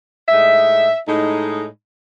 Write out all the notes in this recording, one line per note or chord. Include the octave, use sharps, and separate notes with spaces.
A2 G#3 D#4 E5
A2 G#3 D#4